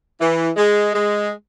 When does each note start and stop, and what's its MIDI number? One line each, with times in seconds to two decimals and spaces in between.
0.20 0.49 52
0.56 0.91 56
0.93 1.29 56